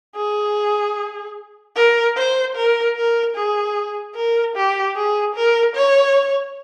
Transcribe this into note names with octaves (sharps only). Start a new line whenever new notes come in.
G#4
A#4
C5
A#4
A#4
G#4
A#4
G4
G#4
A#4
C#5